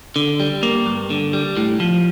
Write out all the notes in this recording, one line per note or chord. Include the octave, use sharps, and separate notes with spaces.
D3
G3
A#3
G2
D3
G3
A2
F3